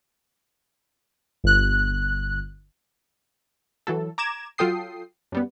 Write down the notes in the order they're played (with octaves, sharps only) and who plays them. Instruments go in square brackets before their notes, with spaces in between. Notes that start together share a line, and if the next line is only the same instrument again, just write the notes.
[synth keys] G1 F#6
[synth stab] E3 F#3 A4
A#5 D6 G#6 E7
F#3 F4 A4 G5 D#6 C7
F#2 G3 B3